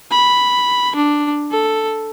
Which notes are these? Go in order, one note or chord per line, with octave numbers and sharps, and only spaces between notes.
B5
D4
A4